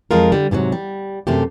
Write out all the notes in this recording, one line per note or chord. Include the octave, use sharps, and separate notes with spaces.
F2 F3 G#3 F4 A#4
D3 G3
G#2 C3 E3 F#3
G3
F#2 C3 A3 G4